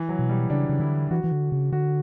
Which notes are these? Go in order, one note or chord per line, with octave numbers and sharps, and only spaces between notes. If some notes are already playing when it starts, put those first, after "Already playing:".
Already playing: E3
F#3
B2
G3
C#3 D4
C#3
D3 E4
E3 F#4
E3
D3
C#3
D3 F#4